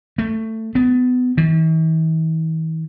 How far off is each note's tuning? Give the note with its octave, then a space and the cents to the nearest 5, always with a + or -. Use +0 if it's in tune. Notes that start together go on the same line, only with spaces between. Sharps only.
A3 +15
B3 +25
E3 -45